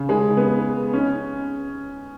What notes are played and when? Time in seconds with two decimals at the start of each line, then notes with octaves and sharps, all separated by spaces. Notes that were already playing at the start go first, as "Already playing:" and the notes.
Already playing: C#3
0.09 G#3
0.37 B3
0.93 C#4